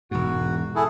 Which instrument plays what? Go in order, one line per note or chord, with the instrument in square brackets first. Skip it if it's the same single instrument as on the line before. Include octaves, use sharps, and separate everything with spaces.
[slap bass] E1 G#2 [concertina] F#4
[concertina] E4 G#4 A4